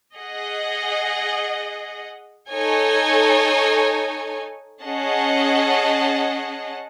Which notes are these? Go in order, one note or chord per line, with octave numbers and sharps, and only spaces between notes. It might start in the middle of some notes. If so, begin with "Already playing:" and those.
G#4 D#5 F#5
D#4 A4 C#5 G#5
C#4 G#4 D#5 F#5 A5